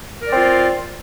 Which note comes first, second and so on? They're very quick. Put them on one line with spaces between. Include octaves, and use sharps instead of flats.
A#4 D5 C4 F4